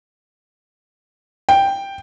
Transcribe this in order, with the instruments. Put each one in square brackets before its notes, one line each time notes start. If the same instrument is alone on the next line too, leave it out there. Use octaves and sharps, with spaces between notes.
[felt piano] G5